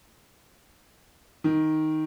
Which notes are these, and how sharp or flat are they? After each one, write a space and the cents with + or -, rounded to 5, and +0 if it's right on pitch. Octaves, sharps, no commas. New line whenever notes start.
D#3 +5